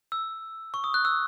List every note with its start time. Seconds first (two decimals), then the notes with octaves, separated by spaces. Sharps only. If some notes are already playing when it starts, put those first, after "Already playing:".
0.12 E6
0.74 C#6
0.84 D#6
0.94 F#6
1.05 E6